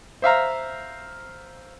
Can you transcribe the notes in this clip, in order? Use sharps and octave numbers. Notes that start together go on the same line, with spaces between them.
C5 E5 F5 A#5